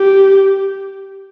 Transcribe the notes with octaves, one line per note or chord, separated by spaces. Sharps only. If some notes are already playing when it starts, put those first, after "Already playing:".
Already playing: G4